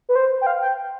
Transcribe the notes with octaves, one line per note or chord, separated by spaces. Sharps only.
B4
C5
G5
F5
G5